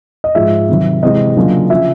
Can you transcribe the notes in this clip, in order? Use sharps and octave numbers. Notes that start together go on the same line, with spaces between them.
D#5
G#2 F3 G#3 E5
C3 D#3 F#3
C3 E3 G#3 D#5
C#3 F#3 A#3 D4 F4
C#3 F3 E5